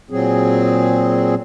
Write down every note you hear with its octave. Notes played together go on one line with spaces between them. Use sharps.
A#2 F#3 C4 G#4